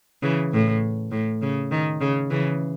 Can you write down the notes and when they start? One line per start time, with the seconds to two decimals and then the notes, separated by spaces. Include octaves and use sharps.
0.23 C#3 E3
0.53 A2
1.11 A2
1.42 C#3
1.71 D#3
2.01 C#3
2.30 C#3 E3